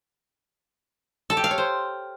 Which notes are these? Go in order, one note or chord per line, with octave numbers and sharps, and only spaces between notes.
A4
G4
F5
C#5
C5